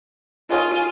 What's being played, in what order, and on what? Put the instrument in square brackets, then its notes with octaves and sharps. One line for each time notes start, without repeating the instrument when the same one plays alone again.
[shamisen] D#3 C#5 D#5 [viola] F4 [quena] G#5